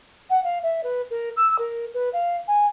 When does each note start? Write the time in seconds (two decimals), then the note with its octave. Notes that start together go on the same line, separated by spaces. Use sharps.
0.30 F#5
0.44 F5
0.63 E5
0.84 B4
1.11 A#4
1.37 E6
1.59 A#4
1.94 B4
2.13 F5
2.48 G#5